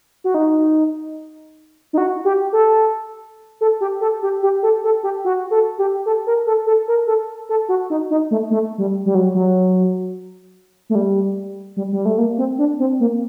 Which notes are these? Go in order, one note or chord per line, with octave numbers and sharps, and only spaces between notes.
F#4
D#4
D#4
F#4
G4
A4
A4
G4
A4
G4
G4
A4
A4
G4
F#4
A4
G4
A4
A#4
A4
A4
A#4
A4
A4
F#4
D#4
D#4
A3
A3
G3
G3
F#3
F#3
A3
G3
G3
G3
A3
A#3
C4
D4
C4
A#3